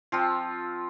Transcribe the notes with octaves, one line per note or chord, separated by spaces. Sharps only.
F3 C4 F4